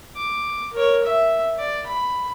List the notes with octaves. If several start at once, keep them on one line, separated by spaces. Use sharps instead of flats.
D6
A#4 C#5
E5
D5
B5